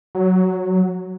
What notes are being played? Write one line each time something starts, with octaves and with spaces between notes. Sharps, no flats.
F#3